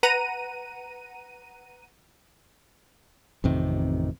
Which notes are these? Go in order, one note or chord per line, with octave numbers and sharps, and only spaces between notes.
B4 F#5 A#5 D#7
A1 F2 C3 D#3